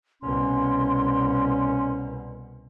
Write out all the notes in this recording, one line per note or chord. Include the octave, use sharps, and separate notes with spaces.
C2 B2 C#4 C6